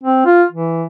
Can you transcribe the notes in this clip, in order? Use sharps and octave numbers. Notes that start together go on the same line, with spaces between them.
C4
F4
E3